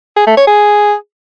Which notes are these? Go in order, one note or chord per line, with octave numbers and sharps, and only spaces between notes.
G#4
A3
C#5
G#4